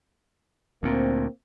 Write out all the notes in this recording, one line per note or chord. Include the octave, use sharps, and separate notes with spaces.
D2 A#2 A#3 C4